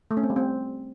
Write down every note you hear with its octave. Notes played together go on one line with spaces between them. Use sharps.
A3
C#4
C4
G3
C4